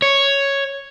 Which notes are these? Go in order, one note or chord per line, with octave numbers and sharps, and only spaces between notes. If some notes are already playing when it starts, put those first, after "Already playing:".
C#5